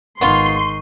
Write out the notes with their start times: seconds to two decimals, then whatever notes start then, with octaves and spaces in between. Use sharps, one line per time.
0.21 G#1 D#3 B3 F4 C6 C#6